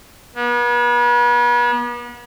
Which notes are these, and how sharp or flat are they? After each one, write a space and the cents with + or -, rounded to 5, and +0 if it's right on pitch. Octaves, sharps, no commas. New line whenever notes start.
B3 -40